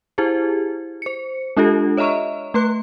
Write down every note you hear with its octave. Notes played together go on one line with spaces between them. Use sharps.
E4 G4 G#4 C5
C5 C#7
G#3 D4 F4 G4 A4
C#5 D#5 E5 A#5 C#6
A3 B4 C6 F#6